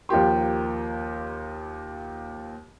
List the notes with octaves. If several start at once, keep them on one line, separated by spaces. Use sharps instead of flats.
D#2 F3 A#3 G4 C6